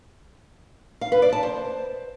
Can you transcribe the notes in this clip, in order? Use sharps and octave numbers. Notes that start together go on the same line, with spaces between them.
F5
B4
D5
A5
C5